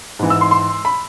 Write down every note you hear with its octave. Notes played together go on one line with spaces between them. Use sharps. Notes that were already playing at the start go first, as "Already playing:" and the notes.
G#2 E3
E6
C6
C6
B5